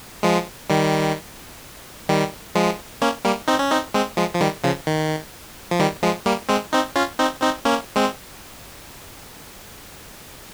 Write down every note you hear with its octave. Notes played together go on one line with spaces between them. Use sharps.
F3 G#3
D#3 G3
D#3 G3
F3 G#3
A#3 C#4
G3 A#3
C4 D#4
C#4
C4 D#4
G#3 C4
F3 G#3
F3
D#3 G3
C#3 F3
D#3
F3
D#3 G3
F3 G#3
G3 A#3
G#3 C4
C4 D#4
C#4 F4
C4 D#4
C4 D#4
A#3 C#4
G#3 C4